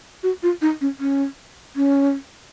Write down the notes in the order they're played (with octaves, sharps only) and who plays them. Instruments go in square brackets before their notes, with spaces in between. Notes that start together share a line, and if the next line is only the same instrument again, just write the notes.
[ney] F#4
F4
D#4
C#4
C#4
C#4